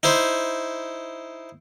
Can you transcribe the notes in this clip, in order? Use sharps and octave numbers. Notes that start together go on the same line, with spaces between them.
D#4 E4 C5